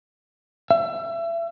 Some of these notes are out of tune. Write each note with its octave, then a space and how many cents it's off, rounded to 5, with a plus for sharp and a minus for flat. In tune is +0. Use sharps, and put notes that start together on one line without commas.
E5 +30